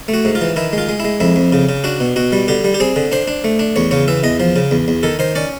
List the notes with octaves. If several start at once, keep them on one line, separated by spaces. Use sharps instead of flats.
A3
F#4
G#2
F4
E3
D#3 E4
G#3
F4
G#3
G#3 E4
F2 E4
F2
C#3
C#3
D4 F#4
B2
B2 F#4
G3
D3 G4
G3
G4
C4 G#4
D3
D4 C5
D4
A3
D4
E2 C#5
C#3 C#5
E3 E5
E2 D#5
F3
C#3
E2
E2
D#3 A4
D#3 C5
C#4 D5